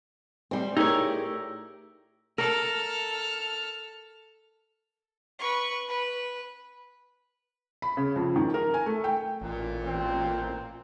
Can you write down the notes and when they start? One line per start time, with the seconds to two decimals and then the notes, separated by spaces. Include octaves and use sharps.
0.51 G3 C4
0.77 A2 D#4 G4 G#4 A#4 C#5 A#5 E6
2.38 A4 A#4 F6
5.39 B4 C#6
5.89 B4
7.82 B5
7.97 C#3
8.16 F2
8.36 D#3
8.54 A#4
8.74 G#5
8.86 A3
9.04 G5
9.41 A1 A#2
9.87 C4